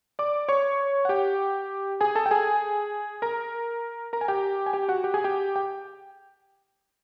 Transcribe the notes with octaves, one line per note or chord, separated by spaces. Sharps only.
D5 D6
C#5 C#6
F#5
G4 G5
G#4 G#5
A4 A5
G5
G#4 G#5
A#4 A#5
A#4 A#5
G#5
G4 G5
G#5
G4 G5
F#4 F#5
G4 G5
G#4 G#5
G4 G5
G5